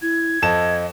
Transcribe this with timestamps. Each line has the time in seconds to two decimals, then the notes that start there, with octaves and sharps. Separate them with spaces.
0.02 E4 G#6
0.42 F2 A4 D#5 E7